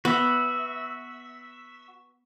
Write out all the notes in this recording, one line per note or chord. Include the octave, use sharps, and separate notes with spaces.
B3 F#4 E5